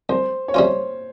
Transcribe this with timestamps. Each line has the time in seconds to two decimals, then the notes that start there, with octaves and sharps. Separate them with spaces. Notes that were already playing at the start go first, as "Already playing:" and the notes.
0.09 C2 C5
0.48 C#5
0.54 C3 G3 C#4 F4 C5